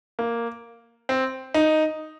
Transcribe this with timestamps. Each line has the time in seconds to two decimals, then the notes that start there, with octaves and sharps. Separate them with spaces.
0.19 A#3
1.09 C4
1.54 D#4